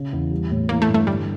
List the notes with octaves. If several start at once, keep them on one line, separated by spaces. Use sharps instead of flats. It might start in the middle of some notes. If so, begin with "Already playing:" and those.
Already playing: C#3
E2
G3
A2
E3 A#3
A3
G2
A3
D3 G3